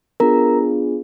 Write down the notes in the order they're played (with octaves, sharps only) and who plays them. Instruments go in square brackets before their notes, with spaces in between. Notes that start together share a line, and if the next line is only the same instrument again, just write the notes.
[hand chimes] B3 D4 F4 G#4 A#4 A#5